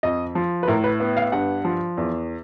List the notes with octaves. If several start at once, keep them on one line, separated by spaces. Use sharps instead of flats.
F2 D#5
F3
B4
A2 A#4
B4
B3
F5
G2 F#5
F3
E2